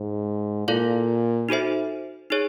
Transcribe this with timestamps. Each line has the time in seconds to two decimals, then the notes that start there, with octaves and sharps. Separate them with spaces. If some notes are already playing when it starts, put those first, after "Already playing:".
Already playing: G#2
0.68 A#2 E4 A4 D5 F5
1.49 D#4 F#4 A4 C5 E5
2.30 D#4 G#4 C#5